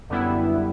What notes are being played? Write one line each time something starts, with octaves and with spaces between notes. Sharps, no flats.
F#2 D3 G3 B3 E4